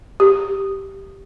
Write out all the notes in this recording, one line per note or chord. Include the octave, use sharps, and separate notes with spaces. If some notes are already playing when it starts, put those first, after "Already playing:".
G4